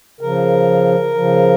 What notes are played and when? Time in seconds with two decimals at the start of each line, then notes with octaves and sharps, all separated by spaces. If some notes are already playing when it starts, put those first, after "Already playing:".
0.21 C#3 F3 A#4
1.14 C#3 F3